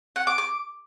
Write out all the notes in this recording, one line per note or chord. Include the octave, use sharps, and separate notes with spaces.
F#5
D6
D6